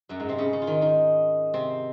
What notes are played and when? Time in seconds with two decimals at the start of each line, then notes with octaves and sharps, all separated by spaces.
0.09 F#2 F#3
0.20 G#2 G#3
0.29 C3 C4
0.38 C#3 C#4
0.53 C#3 C#4
0.62 F4
0.67 D#3 D#4
0.81 D#3 D#4
1.54 C3 C4